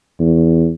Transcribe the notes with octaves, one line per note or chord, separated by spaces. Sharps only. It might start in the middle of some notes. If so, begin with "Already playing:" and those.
E2